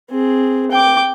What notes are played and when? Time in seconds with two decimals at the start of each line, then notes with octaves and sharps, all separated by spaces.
0.10 C4 G#4
0.72 G5 D6